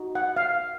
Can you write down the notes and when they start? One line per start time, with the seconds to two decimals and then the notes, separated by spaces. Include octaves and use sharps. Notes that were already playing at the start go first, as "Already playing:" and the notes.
Already playing: D#4 F#4
0.15 F#5
0.37 F5